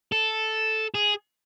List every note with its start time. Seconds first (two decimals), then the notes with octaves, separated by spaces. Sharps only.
0.12 A4
0.94 G#4